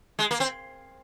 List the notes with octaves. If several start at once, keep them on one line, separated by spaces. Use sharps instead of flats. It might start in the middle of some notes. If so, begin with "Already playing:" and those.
G#3
A#3
C4